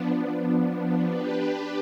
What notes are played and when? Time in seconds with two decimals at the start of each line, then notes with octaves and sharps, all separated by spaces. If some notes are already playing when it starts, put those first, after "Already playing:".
Already playing: F3 B3 D4
1.04 D4 G4 B4